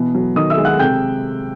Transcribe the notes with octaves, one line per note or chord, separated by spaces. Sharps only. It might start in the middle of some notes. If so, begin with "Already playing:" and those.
Already playing: B2 E3 B3
F#3
D#3 D#5 D#6
E5 E6
G#3
F#5 F#6
C3 G5 G6